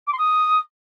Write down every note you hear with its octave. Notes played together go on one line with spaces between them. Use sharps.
D6
C6
D#6